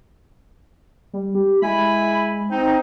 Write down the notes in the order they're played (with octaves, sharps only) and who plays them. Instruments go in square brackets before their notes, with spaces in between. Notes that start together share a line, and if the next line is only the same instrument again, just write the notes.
[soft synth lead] G3
G4
[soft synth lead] G#3 [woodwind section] E4 G#5 B5
[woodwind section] C4 D#4